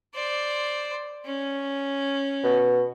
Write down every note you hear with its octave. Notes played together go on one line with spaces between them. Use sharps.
C5 D5
C#4
B2